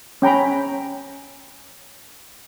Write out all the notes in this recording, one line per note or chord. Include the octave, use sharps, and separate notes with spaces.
C#4 G5 A#5 B5